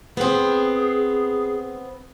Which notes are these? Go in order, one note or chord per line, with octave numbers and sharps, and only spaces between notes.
B3 C4 G#4